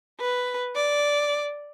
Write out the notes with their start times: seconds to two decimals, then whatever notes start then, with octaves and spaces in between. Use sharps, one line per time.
0.20 B4
0.75 D5